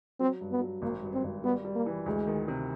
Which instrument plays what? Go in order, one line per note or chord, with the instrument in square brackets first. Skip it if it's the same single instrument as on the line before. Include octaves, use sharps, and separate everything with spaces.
[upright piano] F#3 [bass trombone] C4
[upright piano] G2
[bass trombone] B3
[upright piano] F#3
[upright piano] G#1 [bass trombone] A#3
[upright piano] G2
[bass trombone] C4
[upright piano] G#1
[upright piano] G3 [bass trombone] B3
[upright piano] G3
[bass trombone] A#3
[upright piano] E3
[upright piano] D2 [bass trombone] G#3
[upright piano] D#3
C3